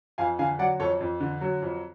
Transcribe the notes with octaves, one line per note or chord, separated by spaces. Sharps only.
F2 F5 G#5
D3 F5 G#5
F#3 D5 F#5
F2 A4 C#5
F2
D3
F#3
F2